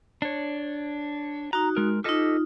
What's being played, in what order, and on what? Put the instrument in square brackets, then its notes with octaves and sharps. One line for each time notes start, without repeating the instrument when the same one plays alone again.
[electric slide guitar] D4 C#5
[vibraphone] D#4 F#4 [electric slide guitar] A#5
[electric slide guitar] G#3 A#4
[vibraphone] D#4 F4 [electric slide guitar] G4 A4 D#5